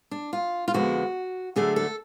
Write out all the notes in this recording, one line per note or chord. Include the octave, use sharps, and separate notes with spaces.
D4
F4
F4
F2 D3 F3 G#3 B3 F#4
D2 D3 F#3 A3 D4 G#4
A4